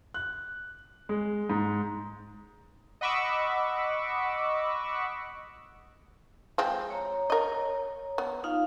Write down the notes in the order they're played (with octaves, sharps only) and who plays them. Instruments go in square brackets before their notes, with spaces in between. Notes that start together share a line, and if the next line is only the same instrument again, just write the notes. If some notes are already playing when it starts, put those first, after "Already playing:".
[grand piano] F#6
G#3
G#2
[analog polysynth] D#5 F#5 B5 C#6 D6 E6
[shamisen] F3 G#3 C4
[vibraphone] C#5 A#5
[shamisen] A#4 D#5
B3
[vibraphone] D#4 F4 F5